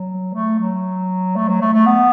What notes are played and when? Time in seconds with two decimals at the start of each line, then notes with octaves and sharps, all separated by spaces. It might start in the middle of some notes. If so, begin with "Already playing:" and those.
Already playing: F#3
0.34 A3
0.59 F#3
1.36 A3
1.49 F#3
1.61 A3
1.73 A3
1.86 B3